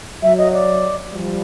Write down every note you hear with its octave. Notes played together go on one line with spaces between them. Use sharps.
F#3 E5
D#5
D5
F3 G3